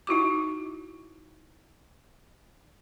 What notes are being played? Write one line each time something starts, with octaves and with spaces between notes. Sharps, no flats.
D#4 E4 F#4 D6